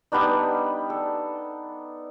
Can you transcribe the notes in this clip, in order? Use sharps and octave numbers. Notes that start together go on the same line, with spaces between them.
G3 B3 D4 D#4
A4